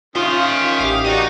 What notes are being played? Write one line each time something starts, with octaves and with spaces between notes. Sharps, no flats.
D#3 C#4 F4 E5 F5 C6 D#6
A1 G4 F5
D#4 F#4 D5 D#5 A#5